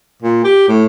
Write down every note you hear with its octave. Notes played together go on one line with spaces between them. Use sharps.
A#2
G4
A2